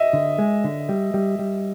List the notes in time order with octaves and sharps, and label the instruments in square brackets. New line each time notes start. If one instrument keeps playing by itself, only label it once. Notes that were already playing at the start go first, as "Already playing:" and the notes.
Already playing: [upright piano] D#5 E5
[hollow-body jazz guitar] D3
G#3
D3
G3
G3
G3